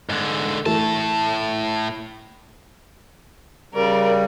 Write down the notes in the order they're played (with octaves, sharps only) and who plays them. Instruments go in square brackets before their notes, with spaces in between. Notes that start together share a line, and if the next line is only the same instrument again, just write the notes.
[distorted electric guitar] G#2 D3
[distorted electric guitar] A2 A5 [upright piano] E3 A3
[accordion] C#3 G3 [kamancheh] A#4 D5